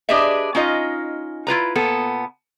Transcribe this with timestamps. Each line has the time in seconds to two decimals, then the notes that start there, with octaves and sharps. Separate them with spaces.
0.09 D4 G4 G#4 B4 D#5 E5
0.55 C#4 D#4 F4 D#5
1.47 E4 F4 B4 A#5
1.75 A#2 B3 A4